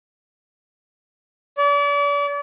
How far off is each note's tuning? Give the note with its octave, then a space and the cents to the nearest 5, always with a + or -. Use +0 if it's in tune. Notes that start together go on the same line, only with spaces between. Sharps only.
D5 -40